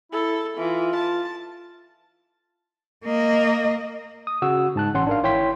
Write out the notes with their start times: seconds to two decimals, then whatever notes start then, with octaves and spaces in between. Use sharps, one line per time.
0.12 E4 A4
0.58 E3 F4
0.96 A5
3.04 A#3 D#5
4.27 D#6
4.42 C#3 F#4 F#5 E6
4.76 G#2 A5 F#6
4.94 A1 C#4 F#5 C6
5.07 D4 A#4 F5
5.23 G#1 E4 C#5 G5 C6 B6